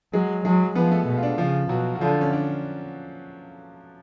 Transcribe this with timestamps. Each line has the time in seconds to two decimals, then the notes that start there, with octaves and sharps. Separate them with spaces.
0.14 F#3 G#3 G#4
0.45 F#3 G#3 G#4
0.75 F3 B3 B4
0.91 A3 A4
1.07 B2
1.17 F4
1.23 D4
1.38 C#3 F3 F4
1.69 B2 F#3 F#4
1.95 F#4
2.00 D3 F3 F4
2.21 C#4
2.33 D4